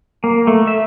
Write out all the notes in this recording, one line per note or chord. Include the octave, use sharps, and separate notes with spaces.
A#3
A3
E5